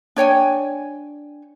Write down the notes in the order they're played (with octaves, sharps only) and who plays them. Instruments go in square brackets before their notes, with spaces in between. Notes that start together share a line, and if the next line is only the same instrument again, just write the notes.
[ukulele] D4 C#5 G5 G#5